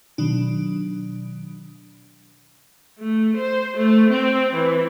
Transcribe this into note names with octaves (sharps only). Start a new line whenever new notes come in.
B2 D#3 F#3 D4
A3
C5
A3
C4
E3